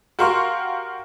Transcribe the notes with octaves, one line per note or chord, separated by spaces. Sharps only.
F#4 G4 A#4 F5 C6 C#6